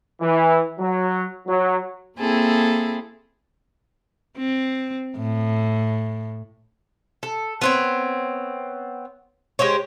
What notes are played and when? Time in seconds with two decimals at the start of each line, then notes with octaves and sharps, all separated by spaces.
0.21 E3
0.79 F#3
1.47 F#3
2.18 A#3 C4 E4 G#4 A4
4.37 C4
5.16 A2
7.23 A4
7.62 B3 C4 C#5
9.59 G#3 G4 C5 C#5